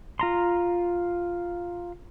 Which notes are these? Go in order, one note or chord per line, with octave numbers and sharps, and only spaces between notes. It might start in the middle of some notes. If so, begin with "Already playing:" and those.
F4 A#5 C6